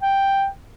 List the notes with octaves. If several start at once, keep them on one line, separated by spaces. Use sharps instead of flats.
G5